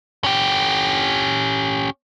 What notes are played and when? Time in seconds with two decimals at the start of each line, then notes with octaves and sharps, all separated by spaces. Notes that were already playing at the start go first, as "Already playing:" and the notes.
0.24 C#4 G4